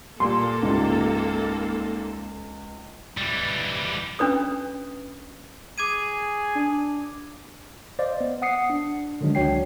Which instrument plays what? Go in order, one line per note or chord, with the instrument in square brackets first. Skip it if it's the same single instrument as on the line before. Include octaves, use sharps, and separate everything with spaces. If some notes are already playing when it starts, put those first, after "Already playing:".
[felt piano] A#2 G3 [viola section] A#3 A4 [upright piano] C6
[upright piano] C#2 [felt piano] G#2 G3 E4
[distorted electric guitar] E3 G3
[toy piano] C#4 D4 B4 D#6
[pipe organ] G#4 G#5 [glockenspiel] D6 G#6 D#7
[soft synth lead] D4
[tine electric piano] C5 D5 D#5 F5
B3
F#5 D#6 C7 C#7
D4
D3 D#3 F#3 G#3 D4
C#2 D4 F#4 C#5 G5 C7